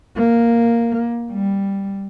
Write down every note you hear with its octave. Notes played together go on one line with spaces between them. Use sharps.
A#3
G3